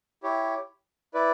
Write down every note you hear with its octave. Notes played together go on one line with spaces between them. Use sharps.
E4 G4 C#5
E4 B4 D5